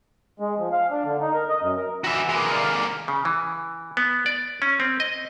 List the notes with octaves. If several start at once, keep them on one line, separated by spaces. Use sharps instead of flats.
G#3
F3
F5
D4
D3
D#4
A#4
D#5
F#2
A#4
D3 E3 F#4 E5
G#3 A#3
D5 F5
C#3
E3
B3
D5
C#4
C4
D#5